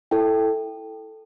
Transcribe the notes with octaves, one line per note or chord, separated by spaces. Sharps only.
E4 A4 G5